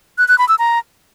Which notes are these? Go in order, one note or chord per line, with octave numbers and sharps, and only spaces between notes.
F#6
F#6
B5
E6
A#5